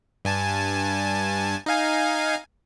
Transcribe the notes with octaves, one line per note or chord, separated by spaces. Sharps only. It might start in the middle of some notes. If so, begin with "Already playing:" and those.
G2 G#5 A5
D#4 F5 G#5